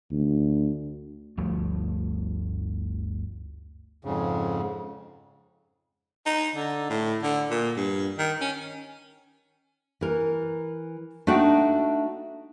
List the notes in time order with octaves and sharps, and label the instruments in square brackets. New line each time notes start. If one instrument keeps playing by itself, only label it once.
[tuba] D2
[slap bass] G1 D2 F3 A3
[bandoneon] F2 G#2 C#3
[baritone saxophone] D#4
D3
A2
D3
A#2
G2
D#3
C#4
[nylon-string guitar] E3 A#4
A3 D4 D#4 F#4 F#5 G5